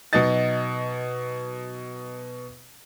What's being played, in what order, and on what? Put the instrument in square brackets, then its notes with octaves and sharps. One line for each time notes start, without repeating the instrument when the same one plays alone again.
[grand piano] B2 F#3 D#4 D#5 A6